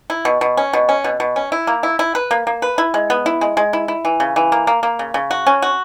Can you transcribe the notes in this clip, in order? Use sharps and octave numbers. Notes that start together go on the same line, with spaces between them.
E4
B2
B2
C#4
B2
C#4
B2
B2
C#4
E4
A#3
E4
E4
B4
A#3
A#3
B4
E4
G#3
B3
E4
G#3
G#3
E4
E4
E3
C#3
E3
A#3
A#3
A#3
C#3
C#3
F#4
C#4
F#4